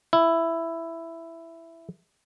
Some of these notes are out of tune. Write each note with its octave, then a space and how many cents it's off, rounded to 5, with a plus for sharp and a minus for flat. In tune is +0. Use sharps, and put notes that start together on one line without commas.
E4 +5